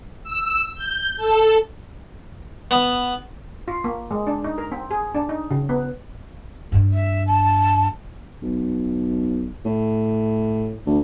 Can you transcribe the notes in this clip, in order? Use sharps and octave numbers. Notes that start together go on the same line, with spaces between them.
E6
G6
A4
B3
F4
A#3
G#3
D4
D#4
A#4
C4
G#4
D4
D#4
C#3
B3
G2 C4
E5
A5
B1
A2
D2